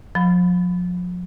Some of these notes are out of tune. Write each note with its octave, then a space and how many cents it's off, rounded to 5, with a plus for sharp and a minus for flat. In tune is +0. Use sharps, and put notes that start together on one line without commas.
F3 +40 B5 +15